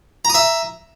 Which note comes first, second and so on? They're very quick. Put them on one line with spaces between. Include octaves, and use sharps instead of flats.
A#5 D#6 E5